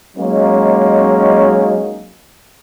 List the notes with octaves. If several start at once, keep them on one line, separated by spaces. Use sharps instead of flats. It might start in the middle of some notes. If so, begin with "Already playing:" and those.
F#3 G#3 A#3 C#4 D#4